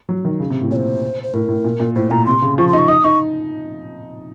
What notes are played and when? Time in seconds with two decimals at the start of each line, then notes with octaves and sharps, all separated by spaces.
0.09 F#3
0.25 D#3
0.40 C#3
0.50 C3
0.61 A2
0.71 A#2 C#5
0.76 C5
1.23 C5
1.34 A2 A#4
1.49 A2
1.64 A#2
1.80 A#2
1.95 A2 C5
2.11 A#2 A#5
2.26 C3 C6
2.42 C#3
2.58 F3 C#6
2.68 C6
2.73 D#4
2.78 C#6
2.88 D#4 D#6
3.04 D#4 C#6